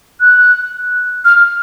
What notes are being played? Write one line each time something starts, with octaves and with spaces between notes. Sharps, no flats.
F#6
F6